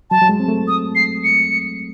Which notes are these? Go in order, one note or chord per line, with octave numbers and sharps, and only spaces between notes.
F#3 A5
F#3
G#3
C4
A3
D#6
C7
C#7